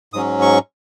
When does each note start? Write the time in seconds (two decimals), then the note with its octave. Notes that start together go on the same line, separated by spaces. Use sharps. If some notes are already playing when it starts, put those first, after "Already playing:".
0.13 G#2 F#3 C#4 D#6
0.42 C#6